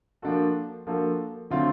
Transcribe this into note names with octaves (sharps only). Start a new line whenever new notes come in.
F3 A#3 D4 F#4 A4
F3 A#3 D4 F#4 A4
D3 F#3 A3 C4 F4